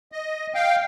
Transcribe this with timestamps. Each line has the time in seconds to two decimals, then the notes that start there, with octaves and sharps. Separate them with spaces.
0.12 D#5
0.55 F5 G5